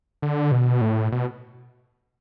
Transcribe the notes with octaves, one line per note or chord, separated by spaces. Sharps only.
D3
B2
A2
B2